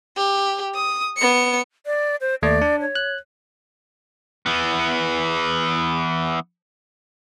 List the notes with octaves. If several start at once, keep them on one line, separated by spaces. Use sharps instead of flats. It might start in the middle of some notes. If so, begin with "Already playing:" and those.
G4
D#6
B3 C#7
D5
C5
D#2 A3 D5
D4
C#5
F#6
E3 B3